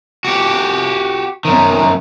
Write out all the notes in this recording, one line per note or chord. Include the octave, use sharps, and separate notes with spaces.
F#4 G4
F#2 D#3